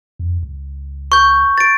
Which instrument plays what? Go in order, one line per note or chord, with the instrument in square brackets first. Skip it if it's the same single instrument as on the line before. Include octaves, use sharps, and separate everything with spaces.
[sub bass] F2
C#2
[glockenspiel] C#6 G6
A6 D7